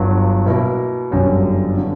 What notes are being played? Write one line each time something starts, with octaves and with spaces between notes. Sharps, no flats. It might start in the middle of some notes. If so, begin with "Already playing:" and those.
Already playing: G1 G2 F#3
B2 A#3 E4 A#4
G1 F#2 D3 G3
D3